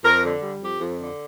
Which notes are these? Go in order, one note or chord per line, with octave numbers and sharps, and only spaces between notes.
F2 A#4
D3
G3
F2 G4
F2
D3